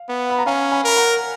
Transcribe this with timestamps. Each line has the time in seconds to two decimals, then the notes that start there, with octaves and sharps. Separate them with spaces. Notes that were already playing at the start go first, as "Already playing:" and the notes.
Already playing: F5
0.09 B3
0.30 B5
0.39 A#5
0.46 C#4 F5 G#5
0.72 G#5 B5
0.84 A#4 B5
0.96 F#5 A#5